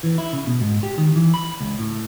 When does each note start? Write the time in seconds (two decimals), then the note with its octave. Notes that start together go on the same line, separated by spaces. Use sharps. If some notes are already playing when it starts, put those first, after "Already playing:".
0.03 E3
0.18 E4
0.33 C#3
0.47 B2
0.61 G#2
0.83 G4
0.98 D#3
1.16 E3
1.34 B5
1.61 C#2
1.79 A2